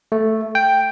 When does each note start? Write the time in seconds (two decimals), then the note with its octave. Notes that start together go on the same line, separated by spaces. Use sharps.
0.12 A3
0.55 G5